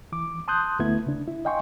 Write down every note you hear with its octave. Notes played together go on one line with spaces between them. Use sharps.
E3 D6
A5 C6 D#6 F#6 G6
D2 A3 B3 E4 G#6
C#3 D4
E4
D#5 F5 G5 G#5 C6 C#6